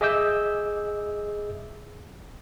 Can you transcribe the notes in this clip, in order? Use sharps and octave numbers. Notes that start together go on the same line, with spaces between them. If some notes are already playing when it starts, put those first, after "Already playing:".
G#4 D#5 E5 D6 E6 G6